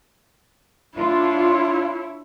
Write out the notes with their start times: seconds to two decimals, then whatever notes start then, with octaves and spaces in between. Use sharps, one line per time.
0.97 D4 E4 F4 C#5